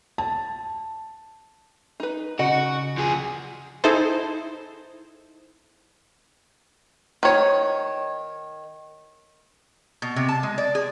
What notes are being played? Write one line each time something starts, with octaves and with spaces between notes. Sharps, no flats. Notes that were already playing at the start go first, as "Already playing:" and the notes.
A5
D#4 B4
C#3 F#4 D#5
F3 G#4
D#4 E4 G#4 A4 C5
D#3 C#5
B2
C3
A5
G#3
D5
G#4